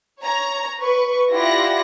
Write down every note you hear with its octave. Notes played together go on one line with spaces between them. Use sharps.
C#5 A#5
B4 C#6
E4 F4 G4 D5 F#5 A#6